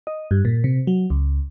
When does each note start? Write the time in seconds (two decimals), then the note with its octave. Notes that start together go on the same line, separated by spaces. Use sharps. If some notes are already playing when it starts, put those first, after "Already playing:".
0.07 D#5
0.31 G2
0.45 A#2
0.64 C3
0.87 F#3
1.10 C#2